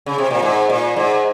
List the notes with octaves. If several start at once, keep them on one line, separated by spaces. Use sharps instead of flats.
C#3
C3
A#2
G#2
A#2
G#2